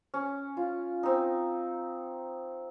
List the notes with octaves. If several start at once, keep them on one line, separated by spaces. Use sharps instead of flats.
C#4
F4
C4 D#4